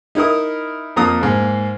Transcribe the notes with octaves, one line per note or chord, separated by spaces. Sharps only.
D#4 E4 A#4 D#6
F2 A#3 A#5 D#6
G#2 A#3